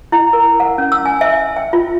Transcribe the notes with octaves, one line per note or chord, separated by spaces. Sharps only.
E4
A#4
F#5
C#4
E6
G#5
E5
G5
F4